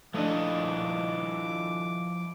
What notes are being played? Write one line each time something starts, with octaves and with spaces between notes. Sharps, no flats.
F3 A3 D4 E4 D#5 D6